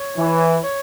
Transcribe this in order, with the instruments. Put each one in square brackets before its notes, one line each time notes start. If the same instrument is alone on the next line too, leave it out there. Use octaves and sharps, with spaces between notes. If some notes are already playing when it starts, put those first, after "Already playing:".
Already playing: [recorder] C#5
[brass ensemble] E3
[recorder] C#5